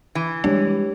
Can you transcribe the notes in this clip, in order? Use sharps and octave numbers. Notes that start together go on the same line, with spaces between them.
E3
G3 G#3 D4 G4 C#5